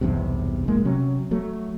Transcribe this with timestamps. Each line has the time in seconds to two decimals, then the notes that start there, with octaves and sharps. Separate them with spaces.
0.01 B1 E2 G2 C3
0.68 E1 A1 G#3 A#3
0.85 C3 F#3 C#4
1.31 F#3 A3